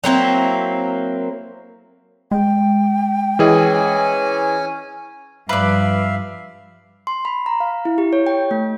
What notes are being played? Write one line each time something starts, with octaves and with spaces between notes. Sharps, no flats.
F#3 A#3 C4 E4
G#3 G5
E3 C#4 G#4 D#5 G#5
G2 F3 B4 D5 E5 F5
C6
B5
A#5
F5
E4
G4
C#5
G5
A3